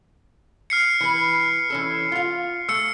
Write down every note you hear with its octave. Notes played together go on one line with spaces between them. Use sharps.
F6 C7 C#7
E3 B4
E3 C#4 A4
F4 F5
A3 E6 C#7